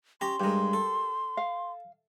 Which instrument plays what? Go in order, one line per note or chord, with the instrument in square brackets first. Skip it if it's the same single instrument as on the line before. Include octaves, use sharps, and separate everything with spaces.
[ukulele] C#4 [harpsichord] G4 A#5 [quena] C6
[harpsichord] G2 G#3 [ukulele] G4 A#4
[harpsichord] A4
[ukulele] F5